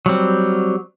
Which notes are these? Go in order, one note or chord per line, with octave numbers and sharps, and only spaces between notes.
F#3 G3 C4